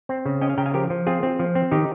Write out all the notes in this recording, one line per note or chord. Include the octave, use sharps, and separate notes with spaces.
C4
C#3
C#4 D#5 G5
F5 G#5
C#3 G5 A#5
F5 G#5
F3 G4 A#4
F3
C4 F4 G#4
C4
F3
C4
D#3 D#4 G4